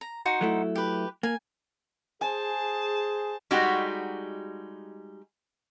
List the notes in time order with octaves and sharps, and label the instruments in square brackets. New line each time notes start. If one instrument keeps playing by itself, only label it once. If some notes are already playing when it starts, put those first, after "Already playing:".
[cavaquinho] A#5
D#4 F#4 C5
[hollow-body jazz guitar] F#3 A3 E4
[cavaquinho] G4 B4
[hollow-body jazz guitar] A#3 [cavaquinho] G#5
[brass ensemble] G#4 [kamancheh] C5 A5 [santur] G#5
[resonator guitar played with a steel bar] G3 G#3 D#4 F#4 G4